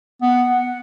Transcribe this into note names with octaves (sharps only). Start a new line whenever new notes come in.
B3 F#5